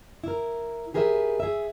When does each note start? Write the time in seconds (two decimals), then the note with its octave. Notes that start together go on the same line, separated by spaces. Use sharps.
0.24 E4 A#4
0.94 G4 G#4 A#4 B4 C#5 E5
1.40 G#4 E5